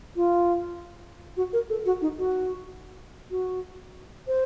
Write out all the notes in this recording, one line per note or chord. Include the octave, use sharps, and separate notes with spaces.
F4
F#4
A#4
A4
F#4
D#4
F#4
F#4
C5